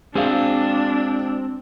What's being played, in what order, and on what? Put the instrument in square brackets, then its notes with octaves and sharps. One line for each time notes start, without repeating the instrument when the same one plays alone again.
[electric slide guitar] G#3 F#4 [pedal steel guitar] C4 [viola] D4 [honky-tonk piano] G#4 F5